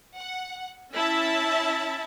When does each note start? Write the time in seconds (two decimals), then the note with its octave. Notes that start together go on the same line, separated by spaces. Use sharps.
0.16 F#5
0.93 C#4 E4 E5 A5